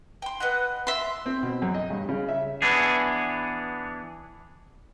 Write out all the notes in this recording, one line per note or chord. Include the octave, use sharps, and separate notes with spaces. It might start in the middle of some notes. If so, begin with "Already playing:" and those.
G5 C6
B4 D#5 F#5
E5 C6
C4
B2
F#2
D#5
G2
C#3
E5
E3 B3 D4 G#4